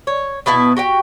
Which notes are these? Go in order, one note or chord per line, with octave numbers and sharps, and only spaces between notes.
C#5
B2 B3 E4 A5
F#4 G4 G5